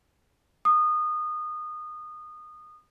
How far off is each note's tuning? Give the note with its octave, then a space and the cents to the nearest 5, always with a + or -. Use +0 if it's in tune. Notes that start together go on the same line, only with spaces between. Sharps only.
D#6 -25